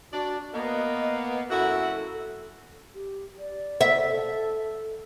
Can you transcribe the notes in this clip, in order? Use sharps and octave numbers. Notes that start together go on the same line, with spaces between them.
D4 F#4 D5
A#3 B3 D#5
F#2 E4 F#4 A4
G4
D5
E5
A4